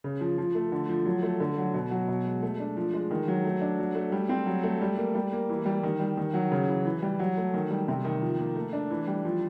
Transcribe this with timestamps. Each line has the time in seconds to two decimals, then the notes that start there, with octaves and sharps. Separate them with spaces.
0.04 C#3
0.21 F3
0.38 F3
0.55 A3
0.72 D3
0.89 F3
1.05 F#3
1.23 A3
1.40 D3
1.57 F#3
1.74 B2
1.91 F#3
2.08 B2
2.25 G#3
2.43 A3
2.60 D4
2.77 F3
2.94 G#3
3.11 D#3
3.28 F#3
3.45 A3
3.61 D4
3.79 F#3
3.95 A3
4.12 G3
4.29 C4
4.46 F#3
4.63 A3
4.81 G3
4.97 A#3
5.15 G3
5.33 A#3
5.49 E3
5.66 G3
5.83 D#3
6.00 G3
6.17 D#3
6.34 F#3
6.52 C#3
6.68 E3
6.86 E3
7.03 G3
7.19 F#3
7.37 A3
7.54 D#3
7.71 G3
7.88 C3
8.05 D#3
8.22 F3
8.39 A#3
8.56 A3
8.73 D4
8.91 E3
9.07 G3
9.25 F3